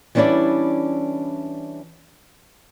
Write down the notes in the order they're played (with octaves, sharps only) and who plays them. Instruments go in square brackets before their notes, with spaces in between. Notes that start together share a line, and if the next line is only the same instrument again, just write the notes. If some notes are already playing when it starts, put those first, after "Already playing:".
[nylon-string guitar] E3 G3 C#4 D4 E4 D5